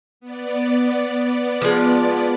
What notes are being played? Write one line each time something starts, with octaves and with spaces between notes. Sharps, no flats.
B3 D5
F3 G#3